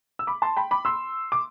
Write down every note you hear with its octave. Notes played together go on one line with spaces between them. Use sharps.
E6
B5 D6
A5 C6
G5 B5
B5 D6
C6 E6
D6